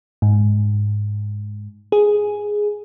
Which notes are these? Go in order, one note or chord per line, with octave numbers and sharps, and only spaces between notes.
G#2
G#4